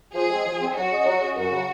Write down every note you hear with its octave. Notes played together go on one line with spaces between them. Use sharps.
F3 G#4
G#3 C4
F3
G#3 C4
F#3 F#4
C#4 G#4 D#5
F#3
C#4 G#4 D#5
F#2 F#4
C#3 F#3